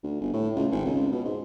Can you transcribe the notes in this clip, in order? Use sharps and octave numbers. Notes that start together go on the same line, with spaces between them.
D2
G1
A2
C#2
G#1
C#2
B2
G#2